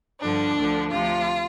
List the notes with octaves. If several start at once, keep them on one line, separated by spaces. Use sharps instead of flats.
G2 D3 F3 D4
D2 D3 F3
D2 C3 F3 F4